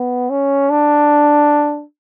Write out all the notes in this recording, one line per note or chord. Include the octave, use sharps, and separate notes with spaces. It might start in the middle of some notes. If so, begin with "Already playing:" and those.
Already playing: B3
C#4
D4